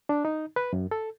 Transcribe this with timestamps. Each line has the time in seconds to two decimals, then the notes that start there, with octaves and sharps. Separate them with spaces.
0.09 D4
0.25 D#4
0.56 B4
0.73 F#2
0.91 A4